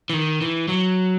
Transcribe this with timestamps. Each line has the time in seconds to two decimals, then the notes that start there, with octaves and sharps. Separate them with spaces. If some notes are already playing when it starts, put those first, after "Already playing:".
0.10 E3
0.13 D#3
0.41 E3
0.68 F#3